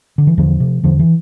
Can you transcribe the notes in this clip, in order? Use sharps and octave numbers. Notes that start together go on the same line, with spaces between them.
D3
E3
E2 D3 F3
C3
E2 D3 F3
E3